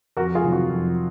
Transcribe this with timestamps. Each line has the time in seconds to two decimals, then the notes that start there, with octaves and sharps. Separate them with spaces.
0.17 F2 F#4 A#4
0.35 F4 G#4
0.44 C3 D#3 F#3
0.53 F#4
0.70 F2